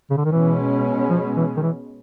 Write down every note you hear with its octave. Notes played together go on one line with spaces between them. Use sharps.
C#3
D3
D#3
B2 E3 G#3 C#4
F3
E3
D#3
E3